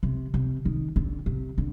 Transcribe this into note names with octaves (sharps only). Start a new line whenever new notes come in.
C3
C3
D#3
D3
C3
D3